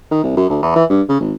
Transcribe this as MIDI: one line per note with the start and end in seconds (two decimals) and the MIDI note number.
0.11 0.22 51
0.23 0.35 36
0.37 0.48 42
0.49 0.57 38
0.62 0.74 40
0.75 0.84 52
0.90 1.01 43
1.09 1.18 49
1.20 1.33 32